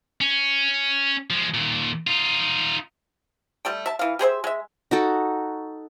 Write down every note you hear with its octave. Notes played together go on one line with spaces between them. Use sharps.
C#4
F3 G#3
D#2 A#2
D#4 F4
G3 A3 G5
E5 A5
E3 F5
G4 G#4 C5 E5
G#3 E5
D#4 F#4 A4